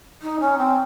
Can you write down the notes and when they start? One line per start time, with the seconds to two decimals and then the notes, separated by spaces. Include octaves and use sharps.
0.22 D#4
0.40 C#4
0.57 C4